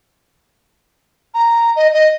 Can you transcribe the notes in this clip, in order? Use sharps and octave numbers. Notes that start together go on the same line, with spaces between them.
A#5
D#5
D#5